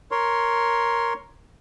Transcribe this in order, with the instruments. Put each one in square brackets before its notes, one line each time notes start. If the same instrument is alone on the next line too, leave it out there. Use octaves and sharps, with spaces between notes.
[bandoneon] A#4 C#5 C6